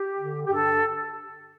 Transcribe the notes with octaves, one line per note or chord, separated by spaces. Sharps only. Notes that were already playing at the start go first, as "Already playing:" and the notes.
Already playing: G4
D3
G4
G2 A4